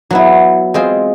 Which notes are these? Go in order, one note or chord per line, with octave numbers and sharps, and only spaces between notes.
F#3 B3 E4
G#3 C4 F4 G#4 C5